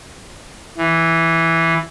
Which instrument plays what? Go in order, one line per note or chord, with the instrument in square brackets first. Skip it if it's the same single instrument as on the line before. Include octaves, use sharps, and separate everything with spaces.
[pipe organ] E3